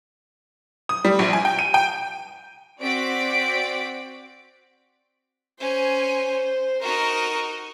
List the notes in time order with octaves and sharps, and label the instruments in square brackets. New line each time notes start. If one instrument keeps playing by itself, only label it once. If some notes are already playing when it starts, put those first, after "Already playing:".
[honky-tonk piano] D#6
G3
A#1
G#5
G5
D#7
G5
[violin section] C4 F#4 D5 B6 D7
[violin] C#4 G#5 [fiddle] C5
[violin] D#4 F#4 [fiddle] A#4 C#6